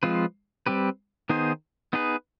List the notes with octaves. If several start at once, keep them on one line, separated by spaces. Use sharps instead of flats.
F3 G#3 C4 F4 B4
G3 C4 G4 B4
D#3 B3 D#4 G#4 C5
B3 D#4 G#4 B4